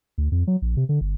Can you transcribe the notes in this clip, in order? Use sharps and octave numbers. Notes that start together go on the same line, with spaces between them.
D2
F2
F#3
A#1
C3
D3
G1